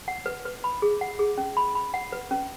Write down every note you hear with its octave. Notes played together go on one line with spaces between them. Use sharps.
F#5
B4
B4
B5
G#4
F#5
G#4
C#4
B5
B5
F#5
B4
C#4